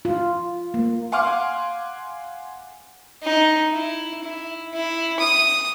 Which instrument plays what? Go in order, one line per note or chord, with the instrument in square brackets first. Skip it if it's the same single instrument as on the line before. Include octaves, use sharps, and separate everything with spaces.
[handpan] F4
A#3
[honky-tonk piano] F5 F#5 G#5 C6 D6 F6
[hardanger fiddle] D#4
E4
E4
E4
D#6